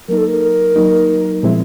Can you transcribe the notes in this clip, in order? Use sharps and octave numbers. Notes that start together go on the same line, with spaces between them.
F#3 A#3 D#4 A#4
A4
A#4
F#3 A#3 D#4
A#2 F3 G#3 C4 E4